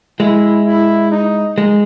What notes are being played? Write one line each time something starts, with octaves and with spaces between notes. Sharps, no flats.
G#3 E4
E4
D#4
G#3